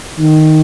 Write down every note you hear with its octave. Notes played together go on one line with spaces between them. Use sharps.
D#3